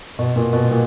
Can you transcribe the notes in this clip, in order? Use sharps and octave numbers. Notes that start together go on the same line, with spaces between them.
B2
A#2
B2
A#2